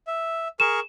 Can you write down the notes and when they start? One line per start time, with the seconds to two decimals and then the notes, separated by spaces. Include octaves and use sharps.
0.07 E5
0.60 G#4 A#4 C#6 E7